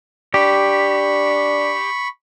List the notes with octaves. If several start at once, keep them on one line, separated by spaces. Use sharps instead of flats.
D4 G4 B5 C#6